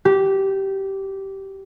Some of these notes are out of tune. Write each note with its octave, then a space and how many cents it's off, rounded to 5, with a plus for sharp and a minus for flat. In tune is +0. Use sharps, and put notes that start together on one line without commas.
G4 -15